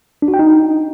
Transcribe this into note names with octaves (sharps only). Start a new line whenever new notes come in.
D4
F#4
G5
D#4